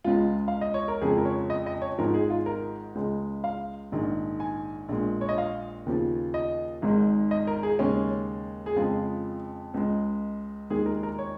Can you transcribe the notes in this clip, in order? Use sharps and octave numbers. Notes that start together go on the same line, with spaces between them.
C#2 C#3 G#3 F4
F5
D#5
C#5
A#4
F2 C#3 F3 G#3 G#4
A#4
C#5
D#5
D#5
C#5
G#1 G#2 F3 G#3 A#4
G#4
F4
A#4
C#2 C#3 G#3
F5
A#1 G#2 D#3 G#3
G#5
A#1 A#2 G#3
C#5
D#5
F5
D#2 C#3 F3
D#5
G#1 G#2 D#3 G#3
D#5
A#4
G#4
D#2 C#3 G#3 C#4
G#4
F2 C#3 F3 G#3 F4
C#2 C#3 G#3
D#2 D#3 G#3 G#4
A#4
A#4
C#5